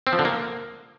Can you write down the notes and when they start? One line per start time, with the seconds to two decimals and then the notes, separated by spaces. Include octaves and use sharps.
0.07 C4
0.13 F3
0.19 D3
0.25 A#3